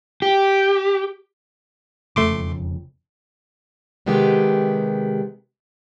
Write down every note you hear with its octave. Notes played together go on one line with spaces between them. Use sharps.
G4
E1 F2 C#3 A3 C6 D6
C3 D#3 G#3 B3 G4